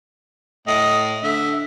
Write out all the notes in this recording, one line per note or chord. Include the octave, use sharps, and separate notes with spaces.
A2 D#5
D3 E5